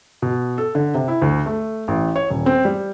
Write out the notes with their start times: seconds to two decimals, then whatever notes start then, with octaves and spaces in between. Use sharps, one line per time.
0.22 B2
0.58 A4
0.75 D3
0.94 C3
1.08 E4
1.22 D2
1.46 A3
1.88 A1
2.16 C#5
2.30 D#1
2.46 C4
2.65 G3